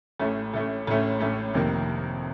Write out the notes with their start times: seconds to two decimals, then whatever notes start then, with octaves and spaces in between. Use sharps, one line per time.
0.19 A1 A2 A3 C#4
0.54 A1 A2 A3 C#4
0.87 A1 A2 A3 C#4
1.20 A1 A2 A3 C#4
1.54 F1 F2 C3 D#3 A#3